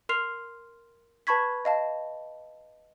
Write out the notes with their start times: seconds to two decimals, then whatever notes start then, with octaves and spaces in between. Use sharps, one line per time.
0.09 A#4 C6 F6 C7 F7
1.27 B4 A5 B5 C#6 G#6 B6
1.65 D#5 F5 A5